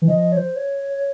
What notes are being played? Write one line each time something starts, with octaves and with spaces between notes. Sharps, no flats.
E3
F3 D#5
C#5
C5
C#5